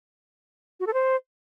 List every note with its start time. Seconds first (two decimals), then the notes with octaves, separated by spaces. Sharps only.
0.80 F#4
0.87 A4
0.94 C5